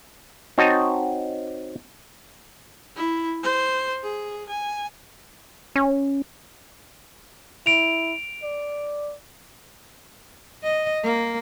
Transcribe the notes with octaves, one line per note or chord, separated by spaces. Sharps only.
C4 D#4 F#4 C#5 D#5 A5
E4
C5
G#4
G#5
C#4
E4 D7 F7
D5
D#5
A#3